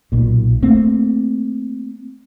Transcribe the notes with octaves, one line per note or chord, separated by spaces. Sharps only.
B1 A#2
A3 A#3 C4